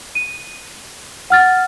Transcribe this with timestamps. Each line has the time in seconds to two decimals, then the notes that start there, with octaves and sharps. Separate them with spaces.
0.15 D#7
1.30 F#5 F6 A6